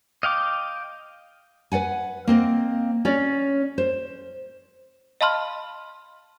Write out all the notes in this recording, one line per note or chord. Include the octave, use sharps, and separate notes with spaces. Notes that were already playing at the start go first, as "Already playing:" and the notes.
D#5 F5 G5 D6
B4 D5 F#5 G#5
A#3 C4 D#5
C#4 C#5 D5
C5
D#5 F5 A5 B5 C6 F6